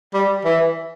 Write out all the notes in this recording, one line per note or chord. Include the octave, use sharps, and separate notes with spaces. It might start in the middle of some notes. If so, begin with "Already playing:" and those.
G3
E3